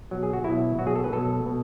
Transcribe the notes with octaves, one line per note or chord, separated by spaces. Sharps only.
B2 F#3
G#4
F#4
B2 F#3 E4
B2 F#3 F#4
G#4
A4
B4
B2 F#3 A4
B2